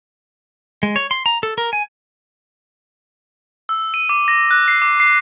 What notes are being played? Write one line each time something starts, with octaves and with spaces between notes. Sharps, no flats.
G#3
C#5
C6
A#5
A4
A#4
G#5
E6
D#7
D6
A#6
F#6
C7
D6
C7